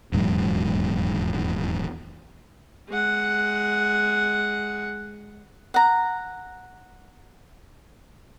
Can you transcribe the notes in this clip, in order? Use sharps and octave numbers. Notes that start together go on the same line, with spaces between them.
D#1 E2 G#2 F#3
G#3 F#5
F#5 A#5